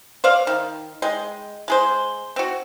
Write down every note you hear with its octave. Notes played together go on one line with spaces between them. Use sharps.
C5 D5 F5
D#3
G#3 D#5 G5
G#3 G#4 C5
C4 F#4